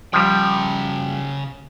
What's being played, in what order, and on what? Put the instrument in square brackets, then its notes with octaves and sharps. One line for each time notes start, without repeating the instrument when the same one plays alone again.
[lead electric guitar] C#3 G5 [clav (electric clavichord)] F3 G3